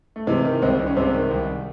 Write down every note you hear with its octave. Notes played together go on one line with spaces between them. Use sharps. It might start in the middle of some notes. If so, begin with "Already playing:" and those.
A3
C3 E3 G#3
D#3
C2 G#3 C4
C2
C#4
C3 G#3 C4
D#3
C2